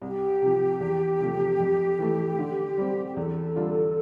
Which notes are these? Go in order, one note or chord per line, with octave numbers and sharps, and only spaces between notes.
C2 G4
C3 F3
E2
C3 F3 A3
F2
E3 A3
D3
G3 C4
G4
E2 A4
D3 G3 D4 F4